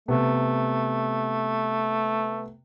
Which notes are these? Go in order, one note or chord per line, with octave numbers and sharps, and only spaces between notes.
C3 A3 B3